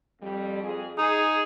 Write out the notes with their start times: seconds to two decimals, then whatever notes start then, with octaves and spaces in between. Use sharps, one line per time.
0.22 F2 G3
0.63 F2 G#4
0.98 D#4 G#4